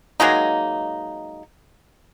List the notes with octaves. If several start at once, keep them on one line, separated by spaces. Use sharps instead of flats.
F#3 G#3 A#3 D#4